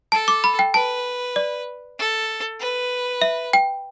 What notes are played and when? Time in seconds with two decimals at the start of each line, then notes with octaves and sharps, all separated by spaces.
0.12 A4 A5
0.28 D6
0.44 B5
0.59 G5
0.74 B4 A5
1.36 D5
1.99 A4
2.60 B4
3.22 E5
3.53 G5